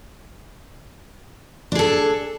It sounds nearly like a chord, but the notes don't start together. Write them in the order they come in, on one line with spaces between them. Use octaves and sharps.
D4 G#4 A4